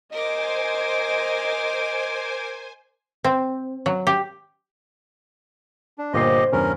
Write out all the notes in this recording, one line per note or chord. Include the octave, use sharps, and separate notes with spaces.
A#4 C5 D#5 G#5 D6
C4
F#3
G4
D4
G1 A#2 G4 C5 D#5 F#5 C7
E2 G2 C#3 C#4 A#4